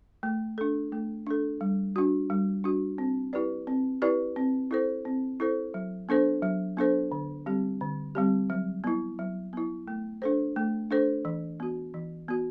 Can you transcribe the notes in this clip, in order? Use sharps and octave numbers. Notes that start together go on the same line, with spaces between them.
A3
D4 A4
A3
D4 A4
G3
D4 F#4
G3
D4 F#4
C4
E4 G4 B4 D5
C4
E4 G4 B4 D5
C4
E4 A4 C5
C4
E4 A4 C5
F#3
B3 D4 A4 C5
F#3
B3 D4 A4 C5
D3
G3 C4 G4
D3
G3 C4 G4
F#3
B3 E4
F#3
B3 E4
A3
D4 A4 C5
A3
D4 A4 C5
E3
B3 F#4
E3
B3 F#4